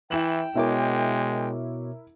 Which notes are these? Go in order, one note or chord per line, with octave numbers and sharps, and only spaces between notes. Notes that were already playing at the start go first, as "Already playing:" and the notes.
E3 E4 G5 E7 F#7
B2 G#3 E4 A#4 C#5 D6